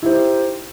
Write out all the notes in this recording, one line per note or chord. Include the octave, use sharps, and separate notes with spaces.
D#4 E4 G4 C5